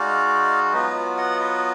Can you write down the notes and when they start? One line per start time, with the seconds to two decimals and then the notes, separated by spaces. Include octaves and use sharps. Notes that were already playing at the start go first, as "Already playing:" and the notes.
Already playing: G#3 D#4 F#4 D5 F5
0.73 F#3 B3 F4 B4 D#5
1.18 D#5 F#5
1.41 B4 D#5